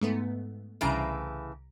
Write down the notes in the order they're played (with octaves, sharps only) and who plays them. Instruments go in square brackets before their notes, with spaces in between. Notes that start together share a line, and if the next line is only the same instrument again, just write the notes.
[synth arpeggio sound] G#2 A3 B3
[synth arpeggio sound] C2 A#5 D7 [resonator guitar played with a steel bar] A2 C#3 E3